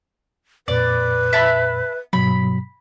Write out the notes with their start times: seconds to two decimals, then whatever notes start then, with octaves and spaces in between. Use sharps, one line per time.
0.68 F2 A#2 B4 D5
1.33 E5 A5 B5
2.13 G2 B2 F#3 B5